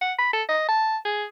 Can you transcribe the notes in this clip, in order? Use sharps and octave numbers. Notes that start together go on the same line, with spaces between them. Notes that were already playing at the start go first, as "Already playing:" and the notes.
F#5
B5
A4
D#5
A5
G#4